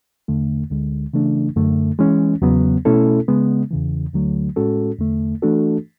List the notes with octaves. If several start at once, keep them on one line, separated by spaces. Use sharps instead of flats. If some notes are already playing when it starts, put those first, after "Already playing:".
E2 D3 A3
D2 D3 G#3
C#3 E3 A3 D4
F#2 D3 A3
E3 G#3 C#4
E2 C#3 F#3 B3
B2 A3 C#4 E4 A4
C#3 G#3 B3
E2 C#3 E3
D2 D3 F#3 A3
A2 G#3 C#4 F#4 A4
E2 D3 A3
E3 A3 D4 F#4 A4